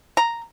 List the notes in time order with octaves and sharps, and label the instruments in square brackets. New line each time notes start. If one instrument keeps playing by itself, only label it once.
[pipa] A#5